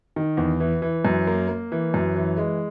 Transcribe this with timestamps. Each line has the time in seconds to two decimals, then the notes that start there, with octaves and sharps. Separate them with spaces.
0.16 D#3
0.37 E2
0.60 E3
0.82 E3
1.05 F#2
1.27 A#3
1.48 A#3
1.72 E3
1.94 F#2
2.16 E3
2.38 G#3